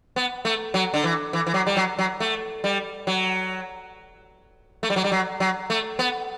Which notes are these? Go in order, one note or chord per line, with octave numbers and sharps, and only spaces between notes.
B3
A3
F#3
D3
E3
E3
E3
F#3
G3
F#3
F#3
A3
G3
F#3
A3
G3
F#3
G3
F#3
F#3
A3
B3